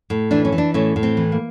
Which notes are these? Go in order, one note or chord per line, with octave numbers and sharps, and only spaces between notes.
A2
E3 D4
C#4
E3
D4
A2 C#4
A2
C4
E3
A#3